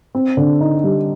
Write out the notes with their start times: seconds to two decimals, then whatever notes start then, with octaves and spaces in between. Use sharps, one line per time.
0.15 C4
0.37 D3
0.61 D#4
0.84 G3